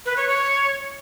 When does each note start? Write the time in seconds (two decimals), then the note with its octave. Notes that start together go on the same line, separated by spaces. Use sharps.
0.06 B4
0.17 C#5
0.28 C#5